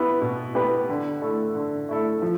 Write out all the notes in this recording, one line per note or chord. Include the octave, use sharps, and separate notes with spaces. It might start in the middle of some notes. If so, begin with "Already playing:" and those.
Already playing: B3 E4 G4 B4
B2
B3 E4 G4 B4
D3
A3 E4 A4
D3
A3 E4 A4
F3